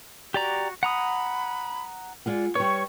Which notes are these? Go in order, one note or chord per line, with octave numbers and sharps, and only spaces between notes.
F#4 G4 D5 A#5
F#5 A#5 B5 D#6
G#3 F4 D5 F#5
G3 B4 C#5 C#6